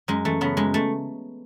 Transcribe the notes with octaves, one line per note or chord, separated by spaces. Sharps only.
F#2 G#3
E3 A3
C#3 B3
F#2 G#3
A3